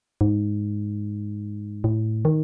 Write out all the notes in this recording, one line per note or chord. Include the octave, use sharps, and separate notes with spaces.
G#2
A2
D#3